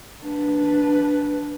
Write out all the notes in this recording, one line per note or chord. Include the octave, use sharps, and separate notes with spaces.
D4 B4